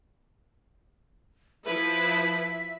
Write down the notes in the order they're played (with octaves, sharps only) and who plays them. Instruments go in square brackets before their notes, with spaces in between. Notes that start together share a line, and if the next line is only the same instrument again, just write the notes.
[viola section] F3 E4 B4 [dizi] E5